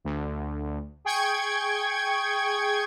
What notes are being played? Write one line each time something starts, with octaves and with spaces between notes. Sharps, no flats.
D2
G#4 G5 C#6 G#6